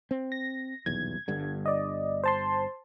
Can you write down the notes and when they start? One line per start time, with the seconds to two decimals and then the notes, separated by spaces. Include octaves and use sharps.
0.11 C4
0.32 A#6
0.86 D#1 B1 E2 G#6
1.28 G1 G2 D3
1.66 D5 D#5
2.24 C5 A5 C6